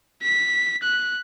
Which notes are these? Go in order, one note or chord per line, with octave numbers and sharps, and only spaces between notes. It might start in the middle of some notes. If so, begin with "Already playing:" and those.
B6
F#6